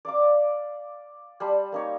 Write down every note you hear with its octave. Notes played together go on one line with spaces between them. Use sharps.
D5 F5 D6
G3 C5 A5 B5
A#3 D#4 C#5